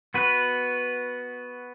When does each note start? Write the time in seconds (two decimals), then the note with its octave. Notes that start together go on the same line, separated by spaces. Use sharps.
0.14 B3 F#4 B4